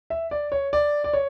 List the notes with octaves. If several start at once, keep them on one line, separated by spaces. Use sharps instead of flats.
E5
D5
C#5
D5
D5
C#5